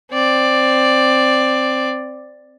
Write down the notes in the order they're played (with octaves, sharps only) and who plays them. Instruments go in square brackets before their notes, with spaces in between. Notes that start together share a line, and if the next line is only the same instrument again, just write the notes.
[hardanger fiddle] C4 D5